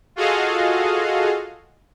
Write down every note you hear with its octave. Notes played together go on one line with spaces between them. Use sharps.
F4 F#4 G#4 A4 D#5 F5